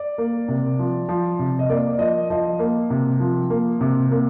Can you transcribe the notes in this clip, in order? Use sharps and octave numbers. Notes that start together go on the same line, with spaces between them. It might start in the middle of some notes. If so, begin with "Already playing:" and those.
Already playing: D5
A#3
C3
F3
F3
C3
D#5
A#3 D5
D5
F3 D#5
F3 D#5
A#3
C3
F3
A#3
C3
A#3